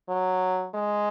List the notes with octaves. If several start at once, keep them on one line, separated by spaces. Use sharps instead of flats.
F#3
G#3